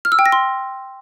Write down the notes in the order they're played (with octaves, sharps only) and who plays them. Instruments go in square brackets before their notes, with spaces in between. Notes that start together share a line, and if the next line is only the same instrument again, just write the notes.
[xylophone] F6
E6
G5
A#6
C6